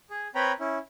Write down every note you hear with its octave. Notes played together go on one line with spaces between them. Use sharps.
G#4
C4 B4 C#5 G5 A#5 B5
C#4 E4